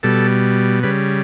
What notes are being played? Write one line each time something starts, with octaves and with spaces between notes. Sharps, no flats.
B2 G3 A4
C#3 G3 B4